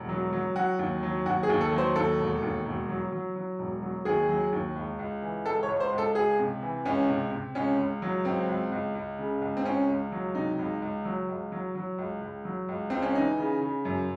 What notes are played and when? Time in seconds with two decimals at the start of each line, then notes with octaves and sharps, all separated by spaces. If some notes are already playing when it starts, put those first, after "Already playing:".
Already playing: E1
0.09 F#3
0.33 F#3
0.56 F#3 F#4
0.79 D#2
1.03 F#3
1.26 D#2 F#4
1.43 G#4
1.49 D#2
1.61 A4
1.72 F#3
1.78 C5
1.96 D#2 A4
2.19 E1
2.43 D#2
2.66 E1
2.89 F#3
3.12 F#3
3.36 F#3
3.59 E1
3.82 F#3
4.05 D#2 G#4
4.29 F#3
4.52 D#2
4.76 C#2
4.99 C#2
5.22 E3
5.45 C#2 A4
5.63 C#5
5.69 C#2
5.80 C5
5.92 C#2
5.98 A4
6.15 C#2 G#4
6.39 C3
6.62 E3
6.85 C#2 C#4
7.09 C3
7.32 C3
7.55 C#2 C#4
7.78 C#2
8.02 F#3
8.25 C#2 C4
8.48 C#2
8.72 C#2
8.95 C#2
9.19 C#3
9.42 C#2
9.57 C4
9.65 C#2 C#4
9.88 C#2
10.12 F#3
10.35 C3 D#4
10.59 C#2
10.82 C#2
11.05 F#3
11.29 C#2
11.52 F#3
11.75 F#3
11.98 C#2
12.22 C#2
12.45 F#3
12.69 C#2
12.90 C#2 C4
13.02 C#4
13.15 E3 D#4
13.38 C#3
13.61 C#3
13.85 F#2